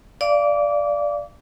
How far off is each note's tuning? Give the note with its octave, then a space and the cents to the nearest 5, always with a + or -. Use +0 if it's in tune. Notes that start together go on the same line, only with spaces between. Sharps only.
D5 -5 F5 -20 D6 -25